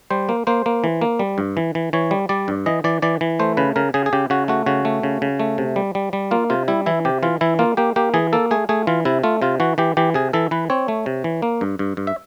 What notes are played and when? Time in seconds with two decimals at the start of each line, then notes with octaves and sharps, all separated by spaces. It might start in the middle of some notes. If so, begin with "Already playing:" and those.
0.10 G3 C5
0.29 A#3
0.47 A#3 C5
0.66 A#3
0.84 E3
1.01 A#3
1.19 G3
1.38 G2
1.57 E3
1.75 E3
1.93 E3 C#5
2.11 G3
2.29 G3 D5
2.48 G2
2.66 E3 D#5
2.84 E3 D5
3.02 E3 D5
3.21 E3
3.39 A3 C5
3.57 C#3 B4
3.76 C#3 A#4
3.94 C#3 G#4
4.06 G#4
4.13 C#3 G4
4.30 C#3 F#4
4.48 A3 F#4
4.66 C#3 F#4
4.85 A3
5.03 C#3
5.22 C#3
5.40 A3
5.58 C3
5.76 G3
5.95 G3
6.13 G3
6.31 A#3 F4
6.50 C3 F4
6.68 G3 E4
6.86 E3 E4
7.05 C3 G4
7.23 E3 F4
7.41 E3 E4
7.59 A#3 F4
7.77 A#3 G4
7.96 A#3 G4
8.14 E3 G#4
8.33 A#3 A4
8.51 A3 G#4
8.69 A3 G#4
8.87 E3 F4
9.05 C3 E4
9.23 A3 F4
9.42 C3 F4
9.60 E3 F#4
9.78 E3 G4
9.97 E3 G4
10.14 C3 G#4
10.33 E3 A4
10.51 E3 B4
10.70 C4 C#5
10.88 A3
11.06 C3
11.24 E3
11.42 A#3
11.61 G2
11.79 G2
11.97 G2
12.07 E5